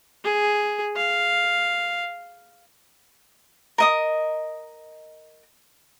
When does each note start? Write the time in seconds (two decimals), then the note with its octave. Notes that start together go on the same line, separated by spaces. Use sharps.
0.24 G#4
0.97 F5
3.78 A#4 D#5 D#6